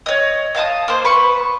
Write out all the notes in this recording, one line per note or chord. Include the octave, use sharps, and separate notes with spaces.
C#5 D#5
D#5 F5 A5 D#6
A#3 C5
B4 B5 C#6